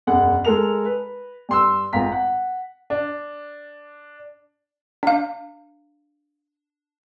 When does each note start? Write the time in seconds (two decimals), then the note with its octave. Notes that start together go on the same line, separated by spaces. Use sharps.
0.07 E1 F#2 F#5
0.45 G#3 A4 A#4 F7
0.85 B4
1.49 G2 C6 E6
1.93 G#1 F4 A#5 B6
2.12 F#5
2.90 D4
5.03 D4 F5